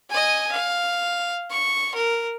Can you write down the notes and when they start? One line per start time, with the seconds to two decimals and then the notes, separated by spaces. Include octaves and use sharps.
0.10 D#5 G#5
0.52 F5
1.51 C#6
1.95 A#4